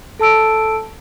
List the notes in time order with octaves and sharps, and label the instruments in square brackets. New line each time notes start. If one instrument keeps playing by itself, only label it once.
[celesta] A4 A5 E6 D7